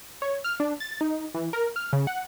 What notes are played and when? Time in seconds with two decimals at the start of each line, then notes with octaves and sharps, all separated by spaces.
0.22 C#5
0.44 F6
0.60 D4
0.80 A6
1.01 D#4
1.34 E3
1.53 A#4
1.76 F6
1.93 C#3
2.07 F#5